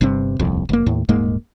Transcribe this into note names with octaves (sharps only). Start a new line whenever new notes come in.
G1 G2 C3 C4
D#1 C2 F2
F1 A#3
D#2 A2
D#1 G#2 G#3 A#3